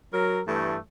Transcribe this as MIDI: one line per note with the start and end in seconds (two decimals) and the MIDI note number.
0.14 0.41 54
0.14 0.41 70
0.47 0.78 43
0.47 0.78 52
0.47 0.78 57